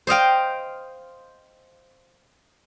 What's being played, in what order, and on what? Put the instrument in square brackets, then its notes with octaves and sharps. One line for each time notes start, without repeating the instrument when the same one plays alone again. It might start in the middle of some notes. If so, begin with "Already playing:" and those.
[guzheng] C5 D#5 F5 G5